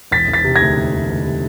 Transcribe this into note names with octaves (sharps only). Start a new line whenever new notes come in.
E1 A6 B6
E1
A6 B6
C3
D2 G#6 A#6
E1
E1
D2
C3